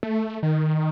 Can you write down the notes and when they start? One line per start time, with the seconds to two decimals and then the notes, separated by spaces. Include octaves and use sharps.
0.03 A3
0.43 D#3